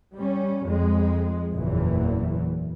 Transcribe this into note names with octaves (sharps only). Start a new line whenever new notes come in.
G3 C#4
F2 G#3
F#1 E2 A#2 E3